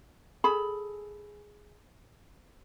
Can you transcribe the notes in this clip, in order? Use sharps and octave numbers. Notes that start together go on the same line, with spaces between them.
G#4 A4 B5